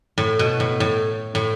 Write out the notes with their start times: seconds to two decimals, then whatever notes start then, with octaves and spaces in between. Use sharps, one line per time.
0.18 A2
0.39 B2
0.60 A2
0.80 A2
1.35 A2